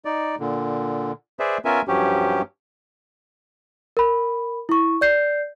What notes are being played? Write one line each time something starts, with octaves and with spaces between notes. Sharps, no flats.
D#4 D5
A#2 D3
G#4 B4 C5 D5 E5
B3 C#4 F4 A#4 E5 G#5
G2 F3 F#3 C#4 G4
A#4 B5
E4 C#6
D5 G6 C7